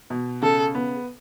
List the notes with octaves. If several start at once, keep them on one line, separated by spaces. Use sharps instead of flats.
B2
C#3 A4
B3